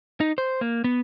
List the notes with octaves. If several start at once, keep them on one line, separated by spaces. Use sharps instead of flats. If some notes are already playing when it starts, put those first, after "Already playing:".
D#4
C5
A#3
B3